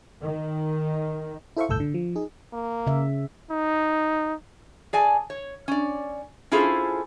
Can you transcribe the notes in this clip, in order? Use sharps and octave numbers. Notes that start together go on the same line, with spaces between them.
D#3
E4 A4 C5 E5 F5 C#6
G1 C2 A2 A4 E6 G6
D3
F3
D#4 G#4
A#3
C#3 E5
D#4
G#4 D5 G#5 A5
C#5
C#4 D5
C#4 E4 F4 G#4 A4 C5